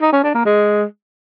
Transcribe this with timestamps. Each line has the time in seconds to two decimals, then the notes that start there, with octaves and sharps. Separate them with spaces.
0.02 D#4
0.13 C#4
0.24 D4
0.35 A#3
0.46 G#3